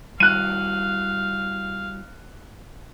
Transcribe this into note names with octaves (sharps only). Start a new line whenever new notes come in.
G3 E4 F#4 F5 F#6 D#7